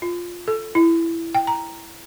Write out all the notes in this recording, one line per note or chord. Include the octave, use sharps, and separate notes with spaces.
F4
A4
E4
G5
A#5